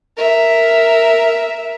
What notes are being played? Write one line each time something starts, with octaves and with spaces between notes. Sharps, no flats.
A#4 E5